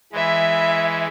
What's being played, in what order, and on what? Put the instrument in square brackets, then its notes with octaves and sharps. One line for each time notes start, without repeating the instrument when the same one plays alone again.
[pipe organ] E3 G#3 [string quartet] E5 B5